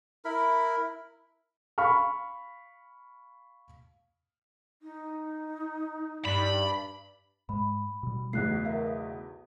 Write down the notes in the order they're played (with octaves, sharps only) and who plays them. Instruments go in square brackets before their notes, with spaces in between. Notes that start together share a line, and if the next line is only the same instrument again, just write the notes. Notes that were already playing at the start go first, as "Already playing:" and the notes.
[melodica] E4 A#4 B5
[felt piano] F5 B5 C#6 F6
[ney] D#4
[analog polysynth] G2 [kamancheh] D5 [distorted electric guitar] B5
[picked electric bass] G#2 G#3 [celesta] B5
[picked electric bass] B2 G3
[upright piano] B1 E2 [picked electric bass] C#3 A3 [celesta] F#6 C7
[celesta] A#4 E5 F5
D#6